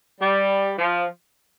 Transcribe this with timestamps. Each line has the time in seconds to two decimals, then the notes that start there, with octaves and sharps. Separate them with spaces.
0.20 G3
0.79 F3